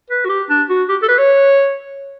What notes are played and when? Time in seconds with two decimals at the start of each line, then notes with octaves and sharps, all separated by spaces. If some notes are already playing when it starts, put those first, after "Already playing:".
0.10 B4
0.25 F#4
0.29 G4
0.50 D4
0.69 F#4
0.89 G4
1.03 A4
1.08 B4
1.18 C#5